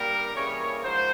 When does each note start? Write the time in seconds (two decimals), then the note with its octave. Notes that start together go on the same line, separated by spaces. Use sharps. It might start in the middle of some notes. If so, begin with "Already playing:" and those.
Already playing: G2 G3 A#3 A#4
0.34 C#3 E3 G3 A#3 C#5
0.83 G#2 F3 C5